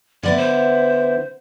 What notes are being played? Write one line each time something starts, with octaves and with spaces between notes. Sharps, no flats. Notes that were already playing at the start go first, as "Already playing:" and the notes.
D3 B3 E4 D5
C5